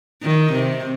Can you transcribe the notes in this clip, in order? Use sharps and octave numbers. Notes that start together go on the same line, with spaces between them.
D#3
C3